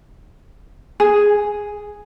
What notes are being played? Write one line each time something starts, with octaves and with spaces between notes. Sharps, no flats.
G#4